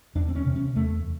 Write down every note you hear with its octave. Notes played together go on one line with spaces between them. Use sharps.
E2 D4
C4
C#4
C3
C#4
E2 A3